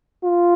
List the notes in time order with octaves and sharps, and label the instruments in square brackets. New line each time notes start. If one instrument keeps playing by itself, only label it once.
[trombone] F4